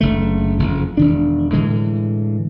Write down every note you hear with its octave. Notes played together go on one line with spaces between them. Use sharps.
F#1 D3 A3
F#1 F2
E1 D#3 D4
A2 D3 E3 G#3